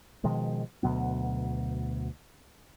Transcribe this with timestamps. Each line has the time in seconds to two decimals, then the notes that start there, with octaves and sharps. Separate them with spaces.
0.24 B2 D#3 F3 G#3
0.83 D2 B2 F#3 B3